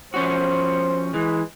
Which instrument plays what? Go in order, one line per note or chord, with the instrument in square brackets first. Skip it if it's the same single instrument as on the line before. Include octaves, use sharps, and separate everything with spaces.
[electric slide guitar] F3 C#4 F#4 [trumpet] C5
[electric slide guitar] E3 [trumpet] G#3